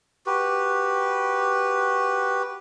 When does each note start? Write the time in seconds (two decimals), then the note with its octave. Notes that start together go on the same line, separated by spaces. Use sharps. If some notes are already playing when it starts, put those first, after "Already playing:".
0.26 F#4 G4 B4